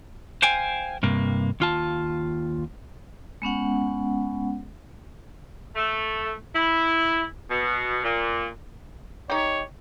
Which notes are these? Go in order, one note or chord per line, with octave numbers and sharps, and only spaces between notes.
C5 F5 G5 G#5
G2 C3 A#3
D#2 F4 A5
G#3 B3 C#4 F#5
A3
E4
B2
A#2
D#4 G4 C#5